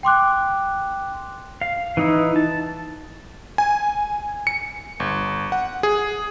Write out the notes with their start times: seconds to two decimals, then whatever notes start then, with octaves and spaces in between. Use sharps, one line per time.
0.03 G5 C6 D6 F#6
1.61 F5
1.97 E3 D#4 E4
2.36 A5
3.58 G#5
4.47 C#7
5.00 G1
5.52 F#5
5.83 G#4